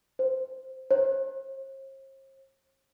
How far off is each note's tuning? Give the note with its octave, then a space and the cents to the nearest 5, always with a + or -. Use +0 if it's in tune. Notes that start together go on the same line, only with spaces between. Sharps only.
C5 +0
C5 +45